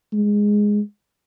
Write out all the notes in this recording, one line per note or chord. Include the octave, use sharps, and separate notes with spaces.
G#3